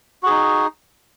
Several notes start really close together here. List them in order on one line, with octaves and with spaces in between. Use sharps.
F#4 G#4 D#4